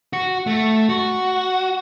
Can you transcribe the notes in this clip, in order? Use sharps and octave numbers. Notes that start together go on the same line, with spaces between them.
F#4
A3
F#4